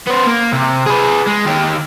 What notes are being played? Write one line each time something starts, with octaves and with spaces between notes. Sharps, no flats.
B3 C5
A#3
C3
G#4 B4
G#3
D#3 G4